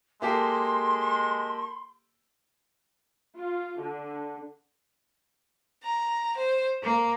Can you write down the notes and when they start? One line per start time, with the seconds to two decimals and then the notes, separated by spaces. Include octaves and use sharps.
0.22 G#3 A#3 G4 A4 C6
3.37 F4
3.79 D3
5.83 A#5
6.36 C5
6.82 A#3